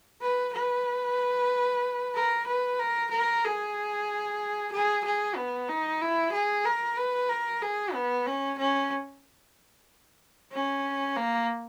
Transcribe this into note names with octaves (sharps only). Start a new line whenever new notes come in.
B4
B4
A#4
B4
A#4
A#4
G#4
G#4
G#4
B3
D#4
E4
G#4
A#4
B4
A#4
G#4
B3
C#4
C#4
C#4
A#3